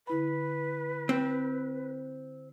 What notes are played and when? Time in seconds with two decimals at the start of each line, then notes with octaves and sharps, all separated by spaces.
0.07 D3 E4 B4 B5
1.09 C4